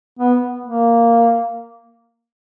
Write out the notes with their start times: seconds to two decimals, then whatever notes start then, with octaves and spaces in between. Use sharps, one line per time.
0.19 B3
0.66 A#3